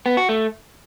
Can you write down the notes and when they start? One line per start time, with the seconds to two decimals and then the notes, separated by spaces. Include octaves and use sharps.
0.06 B3
0.17 F#4
0.29 A3